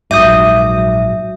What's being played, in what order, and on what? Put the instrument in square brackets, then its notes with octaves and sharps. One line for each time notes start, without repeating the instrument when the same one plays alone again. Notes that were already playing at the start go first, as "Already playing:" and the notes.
[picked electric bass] A#1 G#2 [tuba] F#3 [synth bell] E5 [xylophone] D#6 G6 D#7